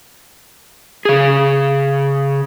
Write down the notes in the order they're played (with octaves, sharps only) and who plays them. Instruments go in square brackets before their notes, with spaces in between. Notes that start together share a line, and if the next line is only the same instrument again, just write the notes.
[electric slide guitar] C#3 G#4